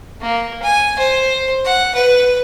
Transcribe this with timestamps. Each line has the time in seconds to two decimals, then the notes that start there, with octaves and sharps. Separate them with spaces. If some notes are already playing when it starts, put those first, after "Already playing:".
0.21 A#3
0.62 G#5
0.98 C5
1.64 F#5
1.95 B4